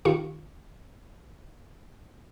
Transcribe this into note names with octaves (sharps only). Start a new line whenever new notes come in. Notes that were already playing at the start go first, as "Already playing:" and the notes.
D#3 F4 G4 C#6